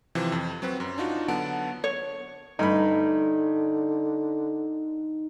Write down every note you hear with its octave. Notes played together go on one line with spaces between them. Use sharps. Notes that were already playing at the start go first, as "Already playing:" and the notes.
C3 E3 F3 C5
F2
F#3 C4 F#4 B4
F#2
D4 D#4 F4 F#4
D3 F#3 B3 F#5 A5 D7
C#5
G2 D3 A3 D#4 B5